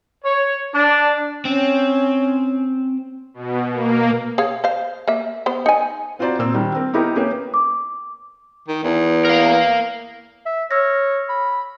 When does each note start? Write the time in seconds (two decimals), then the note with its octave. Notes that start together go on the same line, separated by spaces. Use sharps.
0.25 C#5
0.75 D4
1.45 C4 C#4
3.34 B2
3.72 A#3
4.38 G#4 C#5 F5
4.64 C5 F5
5.08 A#3 E5
5.46 B3 C5
5.66 D#4 G#5
6.19 C4 F4 F#4 C5 D5 A#5
6.39 A#2 A#3 C4 E6
6.54 D#3 G3 D4
6.75 C4 A#4
6.93 B3 D#4 E4 G4 A#4
7.16 A#3 C#4 G4 B4
7.54 D6
8.68 D#3
8.84 E2
9.25 A#4 F5
10.46 E5
10.71 C#5 E6 F6 A#6
11.29 B5